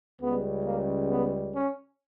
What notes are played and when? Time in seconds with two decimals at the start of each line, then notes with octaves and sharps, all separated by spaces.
0.21 C#2 C#3 G3 B3
0.65 A#3
1.10 B3
1.55 C#4